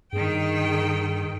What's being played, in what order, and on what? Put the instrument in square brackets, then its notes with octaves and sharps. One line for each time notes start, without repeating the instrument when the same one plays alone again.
[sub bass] G2 [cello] D#3 G5 [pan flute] G#4